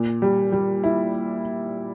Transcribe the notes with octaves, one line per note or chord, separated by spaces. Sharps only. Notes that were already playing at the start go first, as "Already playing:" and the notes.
Already playing: A#2
G3
G3
E4